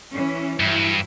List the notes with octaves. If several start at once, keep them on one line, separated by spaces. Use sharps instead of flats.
E3 C#4
G2 E3 F#3 E4